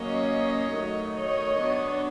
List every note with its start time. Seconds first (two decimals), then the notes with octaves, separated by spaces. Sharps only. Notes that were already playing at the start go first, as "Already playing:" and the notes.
Already playing: F#3 A#3 C#4 C#5 D#5
0.72 D#3 F#3 A3
1.14 C#5 D#5
1.57 F#3 B3 D4